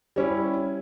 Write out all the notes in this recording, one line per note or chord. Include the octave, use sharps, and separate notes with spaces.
G3 C#4 E4